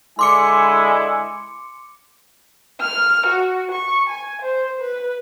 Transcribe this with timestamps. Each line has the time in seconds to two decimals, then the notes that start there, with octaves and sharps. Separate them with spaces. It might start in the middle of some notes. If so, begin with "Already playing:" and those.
0.19 D3 G#3 E4 G#5 C6 D6 C#7
2.81 F6
3.26 F#4
3.72 C#6
4.09 G#5
4.42 C5
4.81 B4